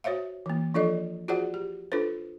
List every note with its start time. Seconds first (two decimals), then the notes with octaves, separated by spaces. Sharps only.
0.04 F#4 C5 C#5 E5 F5
0.46 E3 A#3
0.74 F3 D4 F4 A4 D5 D#5
1.28 F4 F#4 G#4 C5 D5 F#5
1.54 G4
1.92 D4 F4 A4 B4 C5